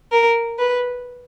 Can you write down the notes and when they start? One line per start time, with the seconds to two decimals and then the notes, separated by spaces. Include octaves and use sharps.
0.12 A#4
0.59 B4